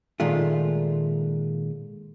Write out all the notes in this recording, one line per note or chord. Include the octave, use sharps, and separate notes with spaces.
A#2 D#3 G#3 A3 F4